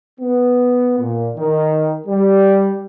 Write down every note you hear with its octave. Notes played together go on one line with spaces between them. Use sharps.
B3
A#2
D#3
G3